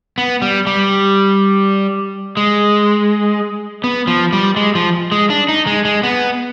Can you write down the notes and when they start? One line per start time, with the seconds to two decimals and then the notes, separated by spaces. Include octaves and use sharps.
0.18 B3
0.42 G3
0.67 G3
2.37 G#3
3.84 B3
4.07 F3
4.33 G3
4.56 G#3
4.75 F3
5.12 G#3
5.30 D4
5.49 D#4
5.67 G#3
5.85 G#3
6.03 B3